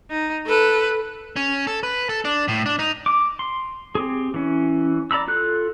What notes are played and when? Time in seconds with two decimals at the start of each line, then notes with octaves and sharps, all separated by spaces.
0.10 D#4
0.46 A4 B4
1.36 C#4
1.67 A4
1.83 B4
2.09 A4
2.25 D4
2.48 A2
2.66 D4
2.79 D#4
3.06 D6
3.39 C6
3.95 C4 G4 G#4
4.34 E3 C#4
5.11 D5 A#5 B5 E6
5.28 F4 A4 F#6